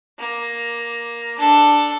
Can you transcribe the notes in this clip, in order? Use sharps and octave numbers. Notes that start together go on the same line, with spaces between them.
A#3
D4 A4